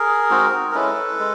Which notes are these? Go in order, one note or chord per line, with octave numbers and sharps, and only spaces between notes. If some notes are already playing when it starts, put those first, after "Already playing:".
Already playing: G#4 A#4
G#3 C4 D#4 F#4
A#4
G#3 C#4 E4 A4 B4
G#3